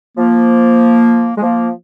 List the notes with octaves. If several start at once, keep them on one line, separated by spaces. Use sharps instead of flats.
F3 A#3
G#3
F3 A#3